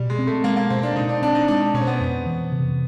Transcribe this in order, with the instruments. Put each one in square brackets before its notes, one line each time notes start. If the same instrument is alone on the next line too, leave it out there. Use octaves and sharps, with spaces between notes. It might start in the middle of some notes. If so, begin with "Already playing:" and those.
Already playing: [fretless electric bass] B2 [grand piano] G3
[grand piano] G#3
[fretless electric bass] C4
[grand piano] A3
[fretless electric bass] G#3 [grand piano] A#3
[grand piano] A#3
[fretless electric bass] B2 [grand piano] C4
[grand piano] D4
[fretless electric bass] B2 [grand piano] D#4
[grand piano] D4
[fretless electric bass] C4 [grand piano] D4
[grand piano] D#4
[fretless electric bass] G#3 [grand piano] D4
[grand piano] D4
[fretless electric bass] B2 [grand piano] C#4
[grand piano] C4
B3
[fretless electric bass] F2
E3
C3